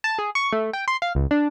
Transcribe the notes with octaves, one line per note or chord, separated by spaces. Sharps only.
A5
G#4
C#6
A3
G5
C6
F5
C#2
D4